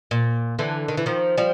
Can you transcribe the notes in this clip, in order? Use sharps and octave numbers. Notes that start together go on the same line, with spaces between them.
A#2
D3 E3
D#3
E3
D#3 F3
F3 G3